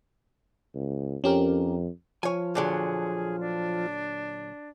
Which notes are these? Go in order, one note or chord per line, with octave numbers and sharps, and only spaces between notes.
C#2
F2 C#4 G4 A#4
F3 C#5 G#5
A#2 D3 F#3 G#4
D4